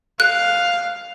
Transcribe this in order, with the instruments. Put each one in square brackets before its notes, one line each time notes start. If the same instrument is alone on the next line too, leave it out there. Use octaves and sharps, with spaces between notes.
[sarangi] F5 [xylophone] F#6